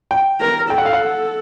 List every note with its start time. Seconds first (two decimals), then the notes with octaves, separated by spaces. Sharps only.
0.11 G5
0.40 A#4
0.70 A4 G5
0.78 F#5
0.85 F5
0.93 F#5